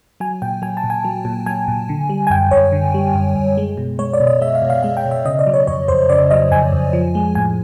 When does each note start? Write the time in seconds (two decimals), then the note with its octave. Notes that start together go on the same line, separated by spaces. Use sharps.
0.20 F#3 G#5
0.42 A#2 G5
0.62 F#3 G#5
0.77 A5
0.84 A#2
0.90 G#5
1.04 F#3
1.25 A#2
1.46 F#3 G#5
1.68 A#2
1.89 D3
2.09 G3
2.27 G#5
2.30 F#2 G5
2.51 F#2 C#5
2.72 D3
2.94 G3
3.15 F#2
3.36 F#2
3.57 G#3
3.77 B2
3.99 G#3 C#5
4.13 D5
4.20 B2
4.27 D#5
4.41 G#3 E5
4.55 F5
4.62 B2
4.70 F5
4.83 G#3 F5
4.97 G5
5.04 B2
5.11 E5
5.25 C#3 D#5
5.39 D5
5.47 F#3
5.54 C#5
5.67 F2 C#5
5.88 F2 C5
6.10 C#3 D5
6.31 F#3 D#5
6.51 F2 G#5
6.72 F2
6.93 F3
7.15 G#3
7.35 A2 G#5